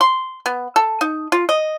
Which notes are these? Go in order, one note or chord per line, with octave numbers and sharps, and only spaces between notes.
C6
B3
A4
D#4
F4
D#5